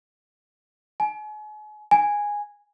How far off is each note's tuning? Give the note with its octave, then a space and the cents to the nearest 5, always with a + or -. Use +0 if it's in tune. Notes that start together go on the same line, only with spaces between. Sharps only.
G#5 +40
G#5 -10